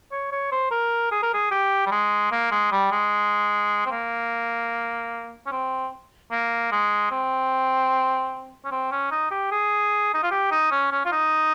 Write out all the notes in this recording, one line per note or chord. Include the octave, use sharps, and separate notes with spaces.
C#5
C#5
C5
A#4
G#4
A#4
G#4
G4
G3
G#3
A#3
G#3
G3
G#3
C4
A#3
C#4
C4
A#3
G#3
C4
C#4
C4
C#4
D#4
G4
G#4
D#4
F4
G4
D#4
C#4
C#4
F4
D#4